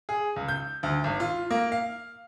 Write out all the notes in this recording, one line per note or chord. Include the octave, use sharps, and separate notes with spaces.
G#4
C#2
G6
D2
G#1
F4
A#3
F5